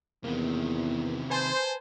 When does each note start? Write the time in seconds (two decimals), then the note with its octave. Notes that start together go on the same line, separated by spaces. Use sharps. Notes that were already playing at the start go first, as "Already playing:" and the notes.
0.24 E2 C3 D#3 A#3 B3
1.30 B4 C5 G#5 A5